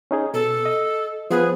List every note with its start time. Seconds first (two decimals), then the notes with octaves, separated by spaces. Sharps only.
0.11 C#4 D#4 G#4
0.34 B2 A4
0.65 D#5
1.30 F3 B3 G#4 B4